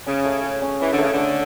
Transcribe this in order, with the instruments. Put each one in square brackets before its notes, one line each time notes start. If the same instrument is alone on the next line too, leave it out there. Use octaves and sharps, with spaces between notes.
[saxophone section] C#3 [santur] C#4
[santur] A3
G#4
C#4
[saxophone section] E3 [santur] C#4
[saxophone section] D3
[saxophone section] C#3 [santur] A3
[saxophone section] D3 [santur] A3